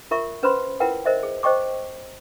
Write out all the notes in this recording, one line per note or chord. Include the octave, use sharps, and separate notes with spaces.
F4 A#4 E5 C#6
C#4 B4 C5 B5 C6
E4 F4 A#4 B4 F#5 G5
A#4 C5 D#5 E5
G#4
C5 D#5 G5 C#6 D6